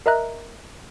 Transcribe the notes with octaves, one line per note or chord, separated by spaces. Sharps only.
A#4 D#5 E5 A#5 F#6